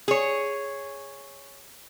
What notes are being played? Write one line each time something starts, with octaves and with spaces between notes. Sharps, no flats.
G#4 C#5